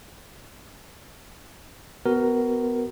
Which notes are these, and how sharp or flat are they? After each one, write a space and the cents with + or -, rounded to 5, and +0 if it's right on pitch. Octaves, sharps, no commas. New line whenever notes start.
B3 +15 F#4 +20 A#4 +0